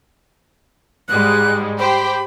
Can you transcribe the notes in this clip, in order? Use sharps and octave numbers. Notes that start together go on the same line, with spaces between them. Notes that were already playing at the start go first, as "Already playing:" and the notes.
G#2 G3 G#3 F#6
G4 C5 G5 B5